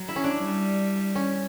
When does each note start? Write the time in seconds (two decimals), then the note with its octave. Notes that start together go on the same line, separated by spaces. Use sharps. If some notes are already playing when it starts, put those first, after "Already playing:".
Already playing: F#3
0.08 E4
0.16 C#4
0.24 D4
0.41 G3
1.15 C#4